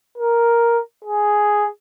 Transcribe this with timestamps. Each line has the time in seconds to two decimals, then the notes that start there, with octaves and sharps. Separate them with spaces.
0.18 A#4
1.04 G#4